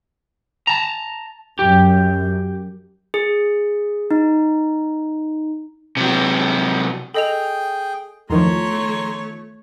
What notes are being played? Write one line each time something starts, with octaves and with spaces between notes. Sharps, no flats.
A5 A#5
F#2 G4
G#4
D#4
C3 F#3
G#4 A4 D#5 G5 F7
E2 D#3 F3 A3 C#5 A#5 C6